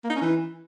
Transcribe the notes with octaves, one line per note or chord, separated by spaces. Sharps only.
A#3
D#4
C#4
E3